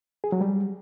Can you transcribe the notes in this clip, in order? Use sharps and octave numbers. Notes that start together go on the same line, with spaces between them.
G#4
F#3
G3